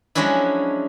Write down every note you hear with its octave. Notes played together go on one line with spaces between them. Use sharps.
F3 F#3 G#3 C#4 D4 E4